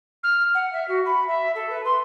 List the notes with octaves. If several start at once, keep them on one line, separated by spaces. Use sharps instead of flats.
F6
F#5
E5
F#4
B5
E5
A4
B4
C6